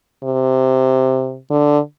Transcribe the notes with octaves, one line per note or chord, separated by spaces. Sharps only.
C3
D3